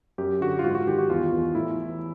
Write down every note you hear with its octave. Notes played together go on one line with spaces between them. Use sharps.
F#2 G4
D3 F#4
F4
G#2 F#4
F#4
D#3 G4
F#4
E2 F4
E2
A2 E4
E3